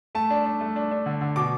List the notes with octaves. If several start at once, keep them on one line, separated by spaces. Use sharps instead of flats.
A3 A5
D4
D4
A3
D4
D4
D3
D3
B2 D6